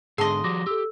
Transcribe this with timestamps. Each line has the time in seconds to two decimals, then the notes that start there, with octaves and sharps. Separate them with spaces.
0.18 G#2 D3 G#4 D#5 A5 C6
0.44 F3 F#4 G4 D6 A#6
0.67 G4 A4 E6